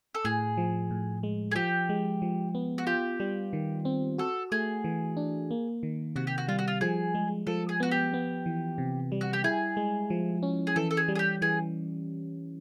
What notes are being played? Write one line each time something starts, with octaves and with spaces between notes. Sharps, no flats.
A4
A2 G#4
F3
A2
G#3
G#4
F3 G4
G#3
F3
B3
F#4
F4 G4
G3
D#3
C4
F#4 A4
A3 G#4
E3
D4
A#3
D#3
C3 F#4
G4
F#4
G3 F4
F#4
F4
F3 G#4
G#3
F3 A4
G#4
B3 F#4
G4
B3
E3
C3
G3
F#4
G4
E4 G#4
G#3
F3
C#4
G#4
E3 A4
A4
G#4
G3
G#4
G4
E3 G#4